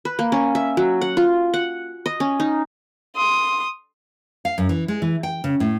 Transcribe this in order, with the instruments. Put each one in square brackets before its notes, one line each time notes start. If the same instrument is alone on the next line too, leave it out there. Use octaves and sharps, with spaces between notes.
[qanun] B4
A#3
C#4
E5
F#3
F#5
F4
F#5
D#5
C#4
D#4
[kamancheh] C6 D#6
[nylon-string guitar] F5
F#2
E3
G#3
E3
G5
C#3
A2